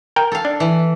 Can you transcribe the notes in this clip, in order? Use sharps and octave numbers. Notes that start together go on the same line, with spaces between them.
A#4 G5
A4 F5
D4
E3